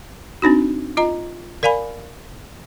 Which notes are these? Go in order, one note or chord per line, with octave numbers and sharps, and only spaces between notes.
C4 D4 D#4 F#4
F4 D#5 A#5
A#4 D5 F5 G#5 B5